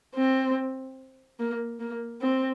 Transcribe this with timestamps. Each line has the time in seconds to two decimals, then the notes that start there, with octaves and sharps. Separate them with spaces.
0.15 C4
1.39 A#3
1.80 A#3
2.21 C4